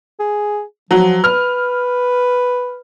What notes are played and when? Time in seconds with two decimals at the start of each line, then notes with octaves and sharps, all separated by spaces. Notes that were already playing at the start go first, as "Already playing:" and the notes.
0.20 G#4
0.91 F3 F#3
1.24 B4 F6